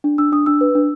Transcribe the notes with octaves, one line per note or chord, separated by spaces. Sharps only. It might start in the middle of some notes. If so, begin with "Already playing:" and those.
D4
D4 E6
D4 D#6
D4 E6
B4
D4